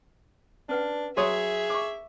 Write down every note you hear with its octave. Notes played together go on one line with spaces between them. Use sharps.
C#4 D4 B4 F#5
F#3 G#4 C#5 E5 C6 D#6
C#6 D6